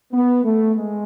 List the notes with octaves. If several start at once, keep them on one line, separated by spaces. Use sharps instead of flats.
B3
A3
G#3